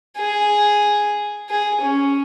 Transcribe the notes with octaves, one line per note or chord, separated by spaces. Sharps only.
G#4
G#4
C#4